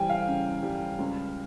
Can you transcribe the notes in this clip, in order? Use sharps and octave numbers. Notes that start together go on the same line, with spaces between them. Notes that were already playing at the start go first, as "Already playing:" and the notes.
Already playing: E3 G3 G5 G#5
F5
C#3
G3
C#2